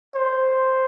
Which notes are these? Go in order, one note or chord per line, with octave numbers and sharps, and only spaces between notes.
C5